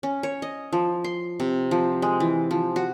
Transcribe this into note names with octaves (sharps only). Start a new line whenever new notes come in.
C#4
C#5
D#5
F3
C6
C3
F3
G#3
E3
F3
F#4